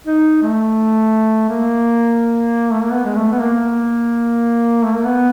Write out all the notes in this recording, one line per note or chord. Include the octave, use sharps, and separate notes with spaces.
D#4
A3
A#3
A3
A#3
B3
G#3
A3
B3
A#3
A3
A#3
B3